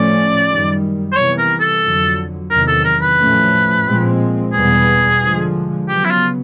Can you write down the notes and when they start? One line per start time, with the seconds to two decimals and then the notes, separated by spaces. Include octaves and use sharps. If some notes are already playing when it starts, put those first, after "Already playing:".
Already playing: A2 F3 A3 C#4 D5
0.48 F#2 D#3 G3
1.12 C5
1.15 C3 E3 G3 B3 C#5
1.39 A#4
1.60 A4
1.84 F2 D3 F#3
2.50 E2 C3 D#3 F#3 A#4
2.68 A4
2.85 A#4
3.02 B4
3.19 A2 F3 A3 C#4
3.86 A#2 F3 G#3 C4
4.53 E2 B2 G3 B3 G#4
5.21 D3 F3 G#3
5.88 C#3 F#3 B3 G4
6.05 E4
6.11 F4